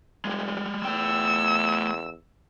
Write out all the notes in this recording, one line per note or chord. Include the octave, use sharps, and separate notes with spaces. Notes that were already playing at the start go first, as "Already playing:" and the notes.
F1 G3 G#3
E2 A3 G5 E6